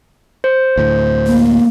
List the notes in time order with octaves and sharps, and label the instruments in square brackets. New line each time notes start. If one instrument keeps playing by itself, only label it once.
[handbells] C5
[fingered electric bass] D2 A2
[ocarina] A#3